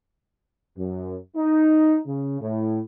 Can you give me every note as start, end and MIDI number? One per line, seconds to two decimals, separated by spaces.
0.77 1.17 42
1.36 1.98 63
2.07 2.39 49
2.41 2.80 45